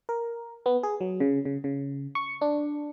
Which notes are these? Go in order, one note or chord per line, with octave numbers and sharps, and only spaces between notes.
A#4
B3
G#4
F#3
C#3
C#3
C#3
C#6
D4